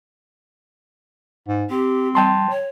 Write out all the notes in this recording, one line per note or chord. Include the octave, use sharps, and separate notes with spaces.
G#2
C4 G4
G3 G5 A5 C6
C#5